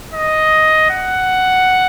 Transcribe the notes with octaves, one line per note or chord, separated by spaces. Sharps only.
D#5
F#5